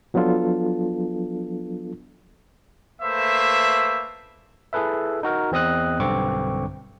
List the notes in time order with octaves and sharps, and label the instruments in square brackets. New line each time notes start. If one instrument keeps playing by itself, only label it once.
[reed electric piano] F3 F#3 B3 D4 F4 A4
[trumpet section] A3 A#3 B4 C5 E5
[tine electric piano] E4 G#4 A4 B4 E5
D#4 F#4 A#4
E2 C4 D#5 D#6 F#6
B1 G2 D3 C4 C#6 D6